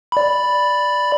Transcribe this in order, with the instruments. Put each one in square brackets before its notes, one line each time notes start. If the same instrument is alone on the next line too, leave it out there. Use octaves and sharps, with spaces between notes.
[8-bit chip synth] D5 B5